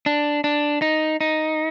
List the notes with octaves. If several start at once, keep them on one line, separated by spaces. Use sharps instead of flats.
D4
D4
D#4
D#4